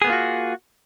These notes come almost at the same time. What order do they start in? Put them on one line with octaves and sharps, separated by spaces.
G#4 B3 A#3 F4 F#4